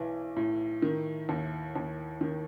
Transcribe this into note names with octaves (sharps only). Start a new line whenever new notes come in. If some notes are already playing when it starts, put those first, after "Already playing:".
Already playing: B1 E3
A2
D#3
D#2
D#2
D#3